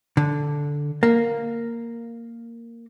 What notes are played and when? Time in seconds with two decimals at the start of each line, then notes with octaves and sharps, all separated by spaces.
0.17 D3
1.03 A#3